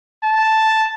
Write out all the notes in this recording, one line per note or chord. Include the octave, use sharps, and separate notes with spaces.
A5